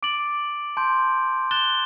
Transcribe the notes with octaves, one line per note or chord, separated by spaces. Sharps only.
D6 A6 D7 F#7
A5 C6 G6 D7
F#6 A6 E7 G7